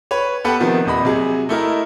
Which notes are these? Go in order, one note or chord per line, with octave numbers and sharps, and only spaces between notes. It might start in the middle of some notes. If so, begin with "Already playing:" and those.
B4 C#5
B3 G4 A4 B4 F#5 G5
C3 D#3 F3 B3
D#1 C3 D#5 B5
C3 F#3 G#4
A3 E4 A#4 D#5